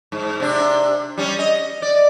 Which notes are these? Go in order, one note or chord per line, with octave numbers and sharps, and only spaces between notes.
G#2
C3 D4
G3 C#4
D#5
D5